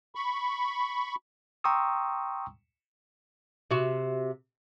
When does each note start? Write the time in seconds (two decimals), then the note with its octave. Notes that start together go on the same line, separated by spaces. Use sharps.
0.15 B5 C#6
1.64 G5 A#5 C6 C#6 D#6 E6
3.71 C3 F#4